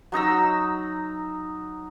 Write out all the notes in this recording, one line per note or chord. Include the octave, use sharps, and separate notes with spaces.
F#3 D#4 A#5 E6